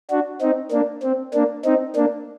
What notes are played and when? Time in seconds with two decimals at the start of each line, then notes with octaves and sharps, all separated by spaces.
0.10 D4 F#4
0.41 C4 D#4
0.72 A#3 D4
1.03 C4
1.34 A#3 D4
1.65 C4 D#4
1.96 A#3 D4